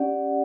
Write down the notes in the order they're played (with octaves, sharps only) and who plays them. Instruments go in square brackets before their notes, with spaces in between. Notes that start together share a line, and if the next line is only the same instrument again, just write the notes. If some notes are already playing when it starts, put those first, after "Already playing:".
Already playing: [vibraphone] C#4 G4 D5 F#5